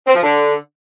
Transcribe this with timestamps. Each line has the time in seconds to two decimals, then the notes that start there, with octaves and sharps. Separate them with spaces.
0.06 C4
0.14 F3
0.22 D3